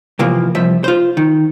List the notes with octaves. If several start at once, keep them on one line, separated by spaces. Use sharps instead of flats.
C3 E3 F3 A#3
C2 F3 E5
F4 C5
D#3